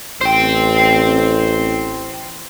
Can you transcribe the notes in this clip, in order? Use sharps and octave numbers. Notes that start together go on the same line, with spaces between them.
A1 C5 G5